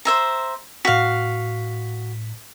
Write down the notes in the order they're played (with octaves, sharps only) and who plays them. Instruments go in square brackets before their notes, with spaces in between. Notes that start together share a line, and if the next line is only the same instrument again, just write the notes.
[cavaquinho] C5 E5 A#5
[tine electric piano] A2 B6 [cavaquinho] F#4 F5